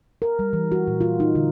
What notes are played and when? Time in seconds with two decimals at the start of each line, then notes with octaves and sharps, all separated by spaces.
0.22 A#4
0.39 G3
0.53 E3
0.72 F#4
0.87 A#2
1.01 F4
1.20 D#4
1.35 D3